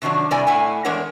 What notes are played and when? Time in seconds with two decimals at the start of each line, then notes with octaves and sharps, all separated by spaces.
0.02 C3 D#3 F3 F#3 D4
0.31 C3 G3 E4 D5 D#5 G#5
0.47 A2 E4 F#5 G#5
0.85 E2 G#3 D4 A#4 C#5 F#5